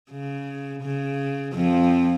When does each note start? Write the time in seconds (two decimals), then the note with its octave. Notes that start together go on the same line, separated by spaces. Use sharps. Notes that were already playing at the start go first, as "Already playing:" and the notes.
0.11 C#3
0.83 C#3
1.55 F2 F3